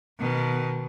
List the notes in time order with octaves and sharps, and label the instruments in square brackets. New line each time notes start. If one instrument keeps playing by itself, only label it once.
[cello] B2 D#3